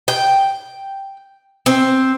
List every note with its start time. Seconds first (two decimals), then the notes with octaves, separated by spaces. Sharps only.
0.08 G5
1.66 C4